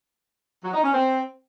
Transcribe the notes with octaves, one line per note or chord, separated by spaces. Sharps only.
F#3
D#4
C#4
C4